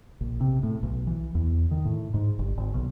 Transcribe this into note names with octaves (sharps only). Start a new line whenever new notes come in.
A#1
C3
A2
B1
E3
E2
D#3
A2
G#2
G1
G#1
B1